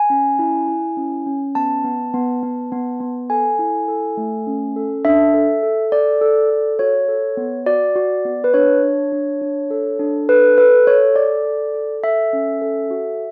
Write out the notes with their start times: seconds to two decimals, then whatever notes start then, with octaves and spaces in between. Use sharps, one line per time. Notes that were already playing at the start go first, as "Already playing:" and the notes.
Already playing: G#5
0.10 C#4
0.39 E4
0.68 E4
0.97 C#4
1.26 C#4
1.55 B3 A5
1.84 B3
2.14 B3
2.43 B3
2.72 B3
3.01 B3
3.30 A4 G#5
3.59 E4
3.88 A4
4.17 A3
4.47 C#4
4.76 A4
5.05 D4 E5
5.34 A4
5.63 A4
5.92 A4 D5
6.21 A4
6.50 A4
6.79 F#4 C#5
7.08 A4
7.37 B3
7.67 F#4 D5
7.96 F#4
8.25 B3
8.44 B4
8.54 D4 C#5
8.83 D4
9.12 D4
9.41 D4
9.70 A4
9.99 D4
10.29 A4 B4
10.58 A4 B4
10.87 A4 C#5
11.16 A4 D5
11.45 A4
11.75 A4
12.04 A4 E5
12.33 C#4
12.61 A4
12.91 F#4